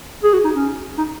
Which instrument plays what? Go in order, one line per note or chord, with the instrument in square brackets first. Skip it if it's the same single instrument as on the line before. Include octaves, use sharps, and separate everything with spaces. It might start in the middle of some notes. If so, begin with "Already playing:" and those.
[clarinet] G#4
F#4
D#4
C#4
D#4